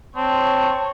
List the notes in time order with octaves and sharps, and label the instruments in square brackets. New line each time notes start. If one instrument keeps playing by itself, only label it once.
[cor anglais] C4 [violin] C#5 [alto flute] A5